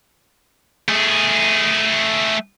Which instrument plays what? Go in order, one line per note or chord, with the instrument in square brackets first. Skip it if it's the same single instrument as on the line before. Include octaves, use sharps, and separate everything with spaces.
[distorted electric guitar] A3 G#4